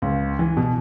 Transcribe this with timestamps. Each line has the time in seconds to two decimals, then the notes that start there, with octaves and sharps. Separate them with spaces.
0.02 C#2
0.39 E3
0.57 B2